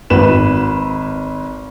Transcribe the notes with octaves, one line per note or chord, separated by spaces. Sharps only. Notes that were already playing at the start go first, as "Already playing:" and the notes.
G#1 B4 E7